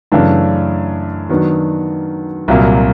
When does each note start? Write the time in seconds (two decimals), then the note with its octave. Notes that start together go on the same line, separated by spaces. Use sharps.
0.12 F#2 C#3 E3 A3 D4
1.29 D#3 F#3 B3 D4
2.48 C2 A#2 F#3 A#3